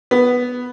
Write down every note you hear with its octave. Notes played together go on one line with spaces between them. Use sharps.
B3